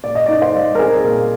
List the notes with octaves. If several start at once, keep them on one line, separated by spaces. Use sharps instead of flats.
A#2 D5
D#5
D#4 D5
C5
G3
A#4
C4 G#4
A#2